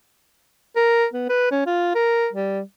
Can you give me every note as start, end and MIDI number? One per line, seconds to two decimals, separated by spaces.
0.76 1.05 70
1.14 1.25 59
1.29 1.51 71
1.51 1.61 61
1.67 1.95 65
1.95 2.28 70
2.33 2.61 55